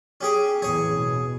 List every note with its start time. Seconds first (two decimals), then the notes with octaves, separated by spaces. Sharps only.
0.21 C#4 G4 G#4
0.62 A1 E2 G#4 C#5
0.93 B2